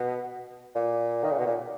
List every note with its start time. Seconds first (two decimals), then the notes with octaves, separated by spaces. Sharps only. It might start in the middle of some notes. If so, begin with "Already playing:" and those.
Already playing: B2
0.75 A#2
1.24 D#3
1.31 C#3
1.39 B2
1.46 A#2